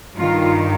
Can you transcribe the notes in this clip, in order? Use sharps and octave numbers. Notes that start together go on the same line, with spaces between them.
G2 D#3 F4